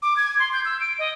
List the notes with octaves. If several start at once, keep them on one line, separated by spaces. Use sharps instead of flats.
D6
G#6
C6
G6
E6
D7
D#5